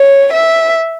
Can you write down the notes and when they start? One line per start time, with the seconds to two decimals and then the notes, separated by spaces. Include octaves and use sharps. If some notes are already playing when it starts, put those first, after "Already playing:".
Already playing: C#5
0.33 E5